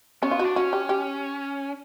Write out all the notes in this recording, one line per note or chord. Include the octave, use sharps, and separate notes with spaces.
B3 C#4
F4
D4 F#4
C#4 F#4
G4
G4